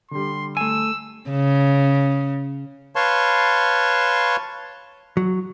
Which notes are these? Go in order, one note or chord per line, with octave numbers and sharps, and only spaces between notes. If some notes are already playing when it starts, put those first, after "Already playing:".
D3 G3 C6
A3 G#5 E6
C#3
B4 C#5 F5 A5 C6 C#6
F#3